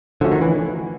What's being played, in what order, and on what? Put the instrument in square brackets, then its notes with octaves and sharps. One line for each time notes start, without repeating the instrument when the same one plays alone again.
[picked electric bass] D3 [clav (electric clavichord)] F3 A3 C#4 F#4
[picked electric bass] D#3
E3